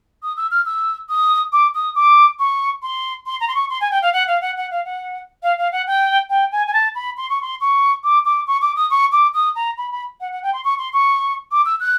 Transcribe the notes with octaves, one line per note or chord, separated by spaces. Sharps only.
D#6
E6
F6
E6
D#6
D6
D#6
D6
C#6
C6
C6
A#5
C6
C#6
C6
G#5
G5
F5
F#5
F5
F#5
F#5
F5
F#5
F5
F5
F#5
G5
G5
G#5
G#5
A5
B5
C6
C#6
C6
C#6
D6
D6
C#6
D6
D#6
C#6
D6
D#6
A#5
B5
B5
F#5
F#5
G5
C6
C#6
C6
C#6
D6
E6
F#6